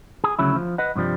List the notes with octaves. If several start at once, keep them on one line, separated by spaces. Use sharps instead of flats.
G#4
D2 C#3 F#3 E4
F3
B4 D#5 F#5
G2 C3 F3 G3